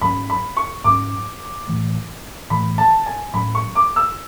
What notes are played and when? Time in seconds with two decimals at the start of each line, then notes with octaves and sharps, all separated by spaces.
0.01 G#2 F#3 C#4 B5
0.30 B5
0.57 C#6
0.84 G#2 F#3 C#4 D6
1.68 A2 E3 A3
2.50 A2 E3 A3 B5
2.78 A5
3.06 G#5
3.34 A2 F#3 C#4 B5
3.55 C#6
3.75 D6
3.96 E6